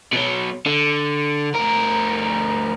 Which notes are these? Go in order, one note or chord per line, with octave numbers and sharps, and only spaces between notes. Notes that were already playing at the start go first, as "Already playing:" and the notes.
B2 F#3
D3
D2 A#4